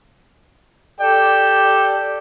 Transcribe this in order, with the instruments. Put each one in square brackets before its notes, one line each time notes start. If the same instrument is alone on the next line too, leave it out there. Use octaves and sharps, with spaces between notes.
[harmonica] G4 A4 G5 [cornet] D5